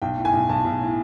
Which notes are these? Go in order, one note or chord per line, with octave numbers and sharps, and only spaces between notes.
B1 G5
A2
G#5
B1
B1 A5
B1
A2